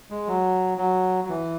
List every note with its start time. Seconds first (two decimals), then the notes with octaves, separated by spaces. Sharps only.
0.10 G#3
0.27 F#3
0.78 F#3
1.24 F#3
1.29 E3